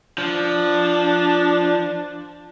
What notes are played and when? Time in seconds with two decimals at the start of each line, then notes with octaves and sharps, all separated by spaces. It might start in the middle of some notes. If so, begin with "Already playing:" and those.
0.18 F3 D4